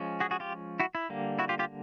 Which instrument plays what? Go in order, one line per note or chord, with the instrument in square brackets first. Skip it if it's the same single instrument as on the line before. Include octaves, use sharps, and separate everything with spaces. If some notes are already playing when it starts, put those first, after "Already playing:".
Already playing: [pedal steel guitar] F3 G#3 C#4
F#4 G#4
F#4 G#4
F4 G4
E4 F#4
E4
D3 G3 A#3
E4 F#4
F4 G4
F4 G4